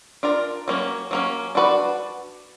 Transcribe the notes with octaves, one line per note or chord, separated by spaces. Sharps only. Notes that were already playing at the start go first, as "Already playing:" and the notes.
D4 F4 A#4 D5
F#3 A#3 C#4
F#3 A#3 C#4
D4 F#4 B4 D5